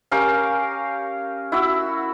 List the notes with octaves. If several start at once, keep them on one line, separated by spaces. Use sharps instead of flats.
C#4 G4 A#4 F5
E4 F#4 E6